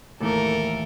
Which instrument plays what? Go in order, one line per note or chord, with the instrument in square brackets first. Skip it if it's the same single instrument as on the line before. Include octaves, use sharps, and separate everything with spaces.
[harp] D#2 A2 E3 [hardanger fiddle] A4 A#4